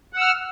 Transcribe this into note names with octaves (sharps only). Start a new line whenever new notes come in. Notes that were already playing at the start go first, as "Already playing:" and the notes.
F#5 E6 F6